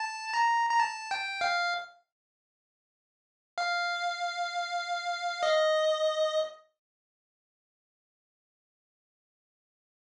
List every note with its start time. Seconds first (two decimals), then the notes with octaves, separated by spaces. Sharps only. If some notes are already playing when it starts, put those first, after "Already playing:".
Already playing: A5
0.34 A#5
0.70 A#5
0.80 A5
1.11 G5
1.41 F5
3.58 F5
5.43 D#5